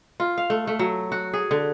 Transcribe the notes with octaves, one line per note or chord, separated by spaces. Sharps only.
F4
F5
A3
A3
F#3
F#4
G#4
D3